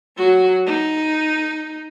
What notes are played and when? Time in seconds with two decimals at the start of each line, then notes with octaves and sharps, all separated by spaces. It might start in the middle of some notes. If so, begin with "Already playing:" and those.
0.17 F#3 F#4
0.67 D#4